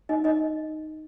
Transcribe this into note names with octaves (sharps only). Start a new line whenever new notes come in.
D#4 D#5
D#4 D#5